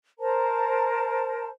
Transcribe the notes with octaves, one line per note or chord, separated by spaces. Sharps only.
A#4 C5 A5 A#5